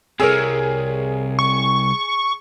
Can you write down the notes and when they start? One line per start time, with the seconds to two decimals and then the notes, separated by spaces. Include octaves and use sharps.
0.20 C2 C3 G#4 A#4 C#5 E6
1.39 C#6